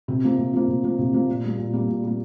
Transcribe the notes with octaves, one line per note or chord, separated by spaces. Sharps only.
C3
F3 A#3
C3
F3 A#3
C3
F3 A#3
C3
F3 A#3
A#2
G3 A#3
A#2
G3 A#3
A#2
G3 A#3